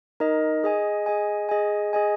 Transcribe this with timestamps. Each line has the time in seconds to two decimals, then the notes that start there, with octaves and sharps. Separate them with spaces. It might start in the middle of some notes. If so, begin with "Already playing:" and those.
0.20 D#4 A#4 D#5
0.64 G#4 D#5 G#5
1.06 G#4 D#5 G#5
1.49 G#4 D#5 G#5
1.93 G#4 D#5 G#5